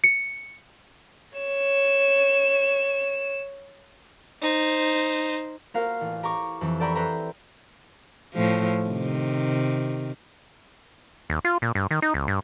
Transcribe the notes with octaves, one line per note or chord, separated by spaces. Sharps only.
C#7
C#5 E7
D#4 C5
A#3 F4 F#4 A#4 C5 F5
A1
G4 A#5 C#6 D6
F2 E3
A4 D5 G5 A#5 B5 C#6
B4 C5 D5 E5 A#5
A2 F3
C3 D#3
D#2
F4
A#2
G2
D#3
D#4
C#2
G2